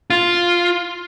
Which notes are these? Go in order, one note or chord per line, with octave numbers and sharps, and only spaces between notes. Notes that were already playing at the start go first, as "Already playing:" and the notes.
F4